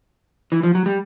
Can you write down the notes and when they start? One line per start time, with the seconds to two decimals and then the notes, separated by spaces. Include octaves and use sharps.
0.52 E3
0.63 F3
0.75 F#3
0.86 G3